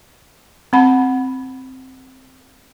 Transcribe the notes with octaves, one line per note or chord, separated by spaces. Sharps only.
C4 F#5 B5